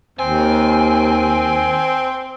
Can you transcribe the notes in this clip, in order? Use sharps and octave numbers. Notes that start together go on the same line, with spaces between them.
D#2 C4 G#5